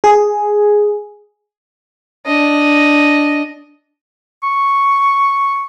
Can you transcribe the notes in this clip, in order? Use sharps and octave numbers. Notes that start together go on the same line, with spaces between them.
G#4
D4 D#5
C#6